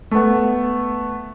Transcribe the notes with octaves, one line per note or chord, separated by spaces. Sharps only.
A3 B3